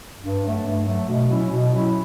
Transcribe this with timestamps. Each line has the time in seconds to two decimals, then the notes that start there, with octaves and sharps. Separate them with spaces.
0.22 G2
0.43 F#3 A3
0.65 G2
0.86 F#3 A3
1.08 B2
1.28 F#3 C#4 E4
1.50 B2
1.71 F#3 C#4 E4